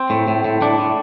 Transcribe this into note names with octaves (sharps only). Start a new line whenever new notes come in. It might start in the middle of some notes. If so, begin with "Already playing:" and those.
Already playing: C4
A2
A2
A2
A2 D4
A2